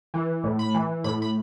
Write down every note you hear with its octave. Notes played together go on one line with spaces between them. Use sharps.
E3
A2
B5
E3
A2 B5
B5